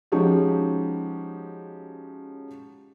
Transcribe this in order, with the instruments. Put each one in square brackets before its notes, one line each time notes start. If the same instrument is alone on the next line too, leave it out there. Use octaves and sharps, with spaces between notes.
[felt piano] F3 G#3 C#4 D#4 F#4 G4